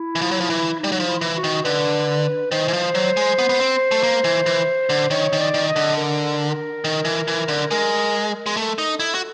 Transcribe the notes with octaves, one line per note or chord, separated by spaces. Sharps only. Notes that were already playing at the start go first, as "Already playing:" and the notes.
Already playing: E4
E3
F3
F#3
F3
E3
D#4
G3
F#3
F3
E4
E3
F#4
D#3
D3 B4
D#3 C5
E3
F3
F#3
G#3
B3
B3
C4
A3
A#3
E3
E3
D3
D#3 C#5
D#3
D5
D#3
D#5
D3
A#4
D#3
E3
E3
D3
G#3 A#4
G#3
A3 A4
D#4
E4
F#4